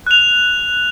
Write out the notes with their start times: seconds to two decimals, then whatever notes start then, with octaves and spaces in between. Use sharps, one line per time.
0.07 F#6 F7